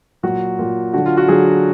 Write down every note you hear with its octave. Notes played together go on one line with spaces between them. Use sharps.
A#2 F#3 F#4
A#2 F#3
D3 F#3 F#4
F4
F#4
D3 F#3 G#4